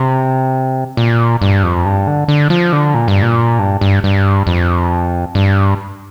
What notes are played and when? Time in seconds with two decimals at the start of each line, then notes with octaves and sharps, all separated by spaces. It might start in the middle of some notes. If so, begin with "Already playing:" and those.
Already playing: C3
0.97 A#2
1.42 G2
1.63 F2
1.85 G2
2.07 D3
2.28 D3
2.50 F3
2.73 D3
2.94 A#2
3.08 G2
3.22 A#2
3.59 G2
3.81 G2
4.04 G2
4.47 F2
5.35 G2